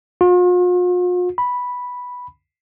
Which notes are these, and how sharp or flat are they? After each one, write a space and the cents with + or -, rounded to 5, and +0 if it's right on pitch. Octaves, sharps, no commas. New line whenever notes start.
F4 +45
B5 -5